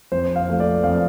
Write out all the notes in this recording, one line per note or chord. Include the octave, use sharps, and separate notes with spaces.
F2 C5
F5
F3 A3
D5
F2 F5